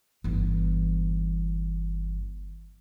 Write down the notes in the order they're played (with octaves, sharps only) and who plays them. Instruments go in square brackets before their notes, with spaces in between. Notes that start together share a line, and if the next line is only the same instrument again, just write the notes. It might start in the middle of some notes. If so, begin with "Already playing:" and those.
[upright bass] G1 E3